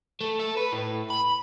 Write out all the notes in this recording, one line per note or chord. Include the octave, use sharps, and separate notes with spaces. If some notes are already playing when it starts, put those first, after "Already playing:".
A3
A4
B4
A2
B5